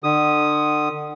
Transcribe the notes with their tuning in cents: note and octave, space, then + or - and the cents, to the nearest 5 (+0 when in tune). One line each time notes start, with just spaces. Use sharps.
D3 +35 D#6 +0